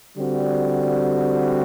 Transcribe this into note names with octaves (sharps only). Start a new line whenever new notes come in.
D3 G3 C4 F#4